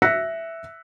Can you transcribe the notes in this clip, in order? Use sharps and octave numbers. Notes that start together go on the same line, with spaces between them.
E5 E6 F#6 A#6 B6 C#7